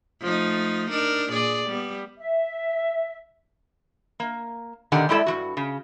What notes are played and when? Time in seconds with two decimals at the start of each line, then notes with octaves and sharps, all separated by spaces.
0.21 F3 A3 D#4
0.90 D4 D#4 A#4
1.32 A#2 G#4 D5
1.68 G3 B3
2.18 E5
4.20 A#3
4.92 B2 D3 D#3 G4 F#5 G#5
5.09 G3 G#3 E4 A4 D5 E5
5.26 G2 E3 F#4
5.57 C#3